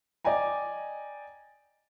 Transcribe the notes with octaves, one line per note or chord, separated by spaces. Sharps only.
D5 D#5 G5 G#5 A#5